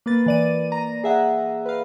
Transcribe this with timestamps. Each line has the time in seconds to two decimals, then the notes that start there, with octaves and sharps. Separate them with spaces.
0.06 A#3 B4 A6
0.26 E3 D5 D#7
0.72 A#5
1.04 G#4 E5 F#5
1.66 B4 F5